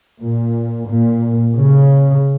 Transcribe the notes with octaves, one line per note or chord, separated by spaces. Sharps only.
A#2
A#2
C#3